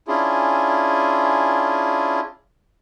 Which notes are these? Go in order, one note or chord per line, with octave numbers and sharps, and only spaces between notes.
C#4 D4 E4 F4 G#4